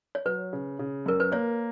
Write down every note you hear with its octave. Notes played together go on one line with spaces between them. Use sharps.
C#5
F#3 B4
C#3
C#3
F#2 A#4
B4
A#3 C#5